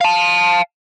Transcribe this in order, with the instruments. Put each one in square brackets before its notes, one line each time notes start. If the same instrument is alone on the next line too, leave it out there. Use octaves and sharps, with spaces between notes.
[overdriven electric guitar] F5 A5